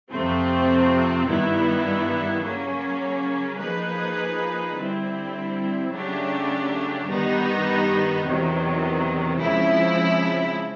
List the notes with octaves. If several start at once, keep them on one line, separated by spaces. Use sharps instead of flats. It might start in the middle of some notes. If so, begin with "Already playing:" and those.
F2 C3 F3 A3 C4
G2 D#3 G3 B3 E4
C#3 F#3 A#3 C#4
F3 A#3 D#4 G#4 B4
D3 G3 C4 E4
C#3 F#3 A3 D4 G4
G2 D#3 G3 B3 D#4
E2 C3 D#3 F#3
C#3 F3 G#3 C4 E4